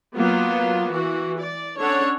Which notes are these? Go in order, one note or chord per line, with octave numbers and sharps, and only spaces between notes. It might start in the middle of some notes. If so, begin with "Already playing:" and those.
F#3 A#3 B3 F4
E3 F#4
D5
C#4 D4 A4 C#5 F#5